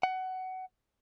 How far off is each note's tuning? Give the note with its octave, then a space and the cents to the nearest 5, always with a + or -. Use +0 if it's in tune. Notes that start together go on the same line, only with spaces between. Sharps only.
F#5 +20